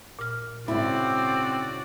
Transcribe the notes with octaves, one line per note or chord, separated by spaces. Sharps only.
A#2 F6
G#2 C#3 C4 E4 F#4 D5